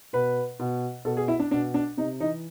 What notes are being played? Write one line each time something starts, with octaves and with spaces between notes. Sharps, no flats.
B2 B4
B2
B2 A4
G#4
E4
D4
B2 D4
D4
C3 D#4
E3 D#4